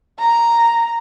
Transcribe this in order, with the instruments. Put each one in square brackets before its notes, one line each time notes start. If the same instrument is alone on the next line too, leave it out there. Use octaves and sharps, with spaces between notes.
[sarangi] A#5